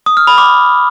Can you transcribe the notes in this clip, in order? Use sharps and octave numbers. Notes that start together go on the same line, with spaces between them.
D#6
F6
B5
D6